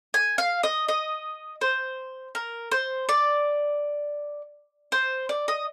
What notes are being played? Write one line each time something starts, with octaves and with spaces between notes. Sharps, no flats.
G#5
F5
D#5
D#5
C5
A#4
C5
D5
C5
D5
D#5